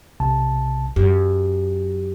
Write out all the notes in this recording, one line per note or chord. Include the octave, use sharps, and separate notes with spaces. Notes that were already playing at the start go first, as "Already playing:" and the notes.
B1 C3 A5
F#2 G4